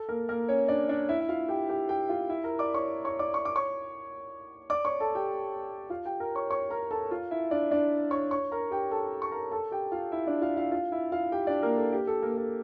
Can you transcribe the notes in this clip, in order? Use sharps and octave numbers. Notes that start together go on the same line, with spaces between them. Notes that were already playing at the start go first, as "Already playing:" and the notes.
Already playing: A4
A#3 A#4
A#3 A#4
C#4 C#5
D4 D5
D4 D5
E4 E5
E5
F4 F5
G4 G5
G4 G5
G4 G5
F4 F5
E4 E5
A#4 A#5
D5 D6
C#5 C#6
C#5 C#6
D5 D6
C#6
D6
C#5 C#6
D5 D6
C#5 C#6
A4 A5
G4 G5
F4 F5
G4 G5
A#4 A#5
C#5 C#6
C#5 C#6
A#4 A#5
A4 A5
F4 F5
E4 E5
D4 D5
D4 D5
C#5 C#6
C#5 C#6
A#4 A#5
G4 G5
A4 A5
C#6
A#4 A#5
A4 A5
G4 G5
F4 F5
E4 E5
D4 D5
F4 F5
F4 F5
F4 F5
E4 E5
F4 F5
G4 G5
D4 D5
A#3 A#4
A4
G4
A4
A#3 A#4
A4